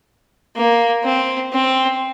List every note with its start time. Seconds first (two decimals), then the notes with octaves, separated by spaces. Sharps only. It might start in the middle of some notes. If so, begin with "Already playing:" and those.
0.56 A#3
1.04 C4
1.52 C4